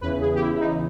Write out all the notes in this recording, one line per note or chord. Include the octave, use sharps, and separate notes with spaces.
E2 C#3 E3 B4
G#4
G4
E4
E4
D#4